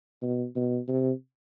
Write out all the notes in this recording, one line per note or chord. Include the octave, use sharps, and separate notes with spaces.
B2
B2
C3